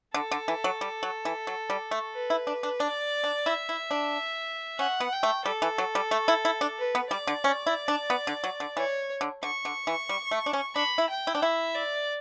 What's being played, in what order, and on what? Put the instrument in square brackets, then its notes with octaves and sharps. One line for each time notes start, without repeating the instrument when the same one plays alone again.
[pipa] D3 [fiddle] A4
[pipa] D3
E3
F#3
G3
F#3
E3
F#3
G3
A3
[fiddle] B4
[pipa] E4
D4
D4
[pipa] D4 [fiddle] D5
[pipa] D4
[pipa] E4 [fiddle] E5
[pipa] E4
D4
[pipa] C#4 [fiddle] F#5
[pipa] B3
[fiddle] G5
[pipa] A3
[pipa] G3 [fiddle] A4
[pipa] E3
F#3
G3
A3
E4
E4
D4
[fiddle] B4
[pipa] B3
[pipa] G3 [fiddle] D5
[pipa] D3
C#4
E4
D4
B3
D3
F#3
D3
[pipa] E3 [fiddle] C#5
[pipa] D3
[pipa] D3 [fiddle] C#6
[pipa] D3
E3
G3
A3
D4
C#4
[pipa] D4 [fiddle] B5
[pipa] E4
[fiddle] G5
[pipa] E4
D4
[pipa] E4 [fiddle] E5
[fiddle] D5